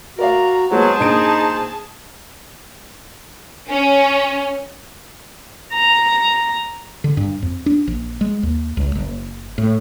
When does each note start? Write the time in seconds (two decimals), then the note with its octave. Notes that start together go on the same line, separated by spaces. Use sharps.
0.19 F#4 A#4 D5 F5 A#5
0.71 F#3 G#3 B3 G#4 C5 A5
1.00 A#1 A#3 D#4 D7
3.69 C#4
5.72 A#5
7.04 D3
7.17 G2
7.42 F2
7.66 D4
7.87 A#1
8.21 G#3
8.43 D#2
8.77 C#2
8.95 F#1
9.58 A2